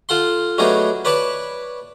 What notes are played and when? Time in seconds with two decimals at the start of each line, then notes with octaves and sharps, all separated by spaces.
0.09 F4 A4 F#5 C6
0.58 F#3 A3 B3 D4 D#4 G#4
1.05 B4 C#5 D5 A5 B5 C#6